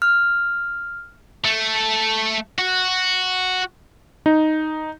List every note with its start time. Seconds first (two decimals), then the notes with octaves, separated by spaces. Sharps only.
0.02 F6
1.45 A3
2.59 F#4
4.26 D#4